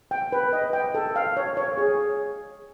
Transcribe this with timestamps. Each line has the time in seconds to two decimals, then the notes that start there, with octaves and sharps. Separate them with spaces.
0.11 G5
0.32 B4
0.53 D#5
0.73 G5
0.95 A4
1.16 F5
1.37 C#5
1.57 C#5
1.77 G#4